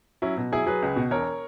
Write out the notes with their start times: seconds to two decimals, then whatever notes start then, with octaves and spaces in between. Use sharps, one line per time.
0.22 F#3 C#4 E4
0.37 B2
0.52 F#3 E4 G#4
0.66 F#3 G#4 B4
0.82 C#2
0.96 B2
1.11 E1 A#4 C#5